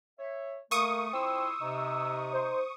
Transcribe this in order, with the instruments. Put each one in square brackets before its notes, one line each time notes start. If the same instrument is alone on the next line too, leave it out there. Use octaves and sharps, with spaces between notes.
[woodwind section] C#5 E5
[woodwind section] A3 [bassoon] A#3 [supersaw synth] C#6 D#6
[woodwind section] F2 E4 C6 [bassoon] C4 [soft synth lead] E6
[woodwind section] C3 [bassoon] D#4
[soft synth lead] C5